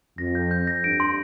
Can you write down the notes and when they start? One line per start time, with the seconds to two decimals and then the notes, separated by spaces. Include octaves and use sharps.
0.18 F2 A#6
0.35 G6
0.51 G6
0.67 A#6
0.84 G2 D7
1.00 C6